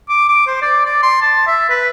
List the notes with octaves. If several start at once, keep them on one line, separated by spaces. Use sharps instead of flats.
D6
D6
C5
D5
D5
C6
A5
E5
B4